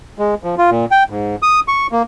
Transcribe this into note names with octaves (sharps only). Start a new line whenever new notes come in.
G#3
F3
F4
A#2
G5
G#2
D#6
C#6
A#3